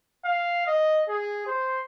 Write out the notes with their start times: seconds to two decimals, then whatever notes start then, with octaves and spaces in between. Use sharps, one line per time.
0.24 F5
0.67 D#5
1.08 G#4
1.47 C5